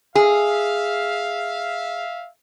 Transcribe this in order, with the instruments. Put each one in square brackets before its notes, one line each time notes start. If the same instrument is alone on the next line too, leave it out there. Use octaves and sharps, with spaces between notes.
[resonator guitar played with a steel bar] G#4 [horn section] E5 F5